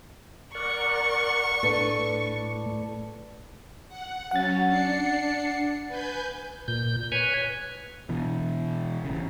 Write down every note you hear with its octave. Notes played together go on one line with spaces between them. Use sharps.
A#4 D5 F#5 C#6
A2 D4 A4 B4
F#5
F#3 C#4 F#5 A6
D4 C7 C#7
B4 G#5 G6
A#2 G6
B4 C#5 G#5
B2 E3
A1 C#3